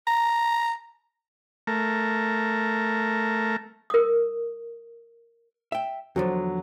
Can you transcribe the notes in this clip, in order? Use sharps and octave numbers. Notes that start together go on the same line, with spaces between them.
A#5
A3 A#4
A#4 D#6
E5 G5
E2 D3 F3 F#3